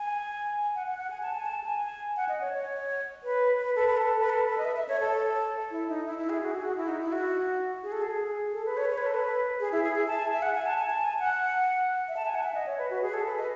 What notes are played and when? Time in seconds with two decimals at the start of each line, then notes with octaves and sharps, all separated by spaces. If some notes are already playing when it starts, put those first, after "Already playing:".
Already playing: G#5
0.75 F#5
0.87 F#5
0.98 F#5
1.10 G#5
1.23 A5
1.34 G#5
1.46 A5
1.64 G#5
2.17 F#5
2.29 D#5
2.41 C#5
2.53 C#5
3.23 B4
3.58 B4
3.76 A4
3.87 B4
3.97 A4
4.21 B4
4.30 A4
4.47 B4
4.58 D#5
4.65 E5
4.76 E5
4.89 C#5
5.00 A4
5.71 E4
5.89 D#4
6.06 E4
6.18 E4
6.30 G#4
6.42 F#4
6.51 G#4
6.62 F#4
6.77 E4
6.88 D#4
7.01 E4
7.12 F#4
7.83 G#4
7.92 A4
8.02 G#4
8.54 A4
8.66 B4
8.77 C#5
8.89 C#5
8.98 B4
9.06 A4
9.14 B4
9.60 G#4
9.72 E4
9.84 G#4
9.96 E5
10.08 A5
10.19 G#5
10.33 E5
10.42 F#5
10.54 G#5
10.66 A5
10.78 G#5
10.90 A5
11.02 G#5
11.19 F#5
12.08 E5
12.17 A5
12.25 G#5
12.35 F#5
12.43 E5
12.55 D#5
12.66 C#5
12.78 B4
12.90 F#4
13.02 G#4
13.14 A4
13.26 B4
13.38 D#5